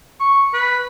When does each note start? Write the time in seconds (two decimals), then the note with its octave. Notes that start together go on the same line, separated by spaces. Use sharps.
0.20 C#6
0.54 B4